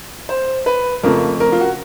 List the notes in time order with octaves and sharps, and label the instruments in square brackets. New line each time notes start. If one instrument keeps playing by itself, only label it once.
[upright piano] C5
B4
F2 C#3 F3 A3 A#4
A#4
F4
F#4